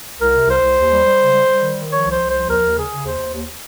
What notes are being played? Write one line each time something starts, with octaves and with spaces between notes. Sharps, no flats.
C2 A#4
C3
C2 C5
C2
D#2
G3
G3
C#3
G3
G3
D#3
D#3
F3 C#5
C2 C5
C2
F3 C5
D#2 A#4
D#2
C#3 G#4
C#3
D#2 C5
D#2
D#2